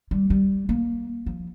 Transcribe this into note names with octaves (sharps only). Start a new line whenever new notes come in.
G3
G3
A#3
F3